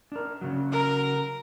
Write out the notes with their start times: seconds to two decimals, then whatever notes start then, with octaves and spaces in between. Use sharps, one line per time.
0.12 D4 A#4
0.41 C#3 F#3
0.72 A#4